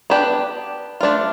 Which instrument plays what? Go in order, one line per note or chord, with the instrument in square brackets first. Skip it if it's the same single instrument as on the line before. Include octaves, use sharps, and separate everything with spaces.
[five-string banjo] B3 D4 G4 B4
A3 D4 F4